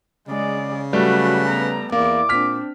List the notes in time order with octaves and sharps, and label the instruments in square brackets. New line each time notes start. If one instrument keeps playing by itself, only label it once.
[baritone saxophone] C#3 [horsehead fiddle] G#3 D5
[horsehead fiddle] F#3 F#4 [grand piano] G3 A3 [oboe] B4
[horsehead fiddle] B3 A#5
[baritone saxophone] E2 [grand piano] A#3 [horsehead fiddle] E4 D5 [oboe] D6
[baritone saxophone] A#2 [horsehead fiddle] C4 D4 [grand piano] F6 B6